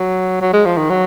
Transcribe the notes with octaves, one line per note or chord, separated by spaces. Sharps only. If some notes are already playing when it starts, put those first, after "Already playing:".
Already playing: F#3
F#3
G#3
F3
D#3
F#3